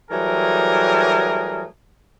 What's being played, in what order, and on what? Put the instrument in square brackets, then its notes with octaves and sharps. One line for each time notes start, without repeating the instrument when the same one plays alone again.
[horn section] E3 F#3 G3 A3 G#4 A#4